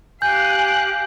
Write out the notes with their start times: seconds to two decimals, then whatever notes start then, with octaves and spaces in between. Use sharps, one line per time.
0.22 G4 F5 G#5 F#6 G6